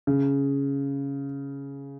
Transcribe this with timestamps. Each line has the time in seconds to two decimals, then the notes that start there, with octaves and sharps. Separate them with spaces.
0.07 C#3